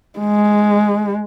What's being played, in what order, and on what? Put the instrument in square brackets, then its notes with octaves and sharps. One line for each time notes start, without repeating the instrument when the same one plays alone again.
[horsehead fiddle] G#3